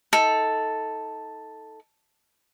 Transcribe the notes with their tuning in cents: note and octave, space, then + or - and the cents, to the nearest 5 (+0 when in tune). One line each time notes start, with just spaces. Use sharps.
D#4 +30 A4 +0